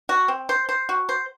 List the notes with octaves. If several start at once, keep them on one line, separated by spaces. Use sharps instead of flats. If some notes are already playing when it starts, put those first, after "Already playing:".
F#4
C4
C5
C5
F#4
C5